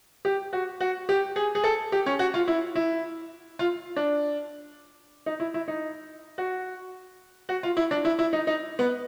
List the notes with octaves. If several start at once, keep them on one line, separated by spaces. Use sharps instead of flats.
G4
F#4
F#4
G4
G#4
G#4
A4
G4
C#4
F#4
F4
E4
E4
F4
D4
D#4
E4
E4
D#4
F#4
F#4
F4
E4
D4
E4
E4
D#4
D#4
B3